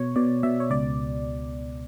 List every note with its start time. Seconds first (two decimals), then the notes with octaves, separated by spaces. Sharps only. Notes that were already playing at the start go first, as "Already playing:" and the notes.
Already playing: B2 C#5
0.16 B2 D5
0.43 B2 E5
0.60 C#5
0.70 C#2 D5